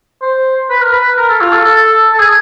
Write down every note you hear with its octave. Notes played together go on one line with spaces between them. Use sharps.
C5
B4
A#4
B4
A#4
A4
F4
A4
A4
A4
G#4